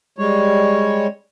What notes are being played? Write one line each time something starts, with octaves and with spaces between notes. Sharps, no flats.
G3 G#3 C#5